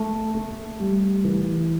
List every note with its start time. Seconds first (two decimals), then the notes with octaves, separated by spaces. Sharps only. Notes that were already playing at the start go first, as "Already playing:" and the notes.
Already playing: A3
0.35 A3
0.80 G3
1.25 E3